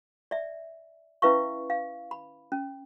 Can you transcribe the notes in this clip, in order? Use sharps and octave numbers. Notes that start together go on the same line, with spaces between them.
D5 E5
C#4 E4 B4 E5 F5 C#6
F5
B5
C#4